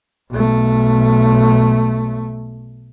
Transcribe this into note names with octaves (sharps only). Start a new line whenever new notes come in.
B1 A3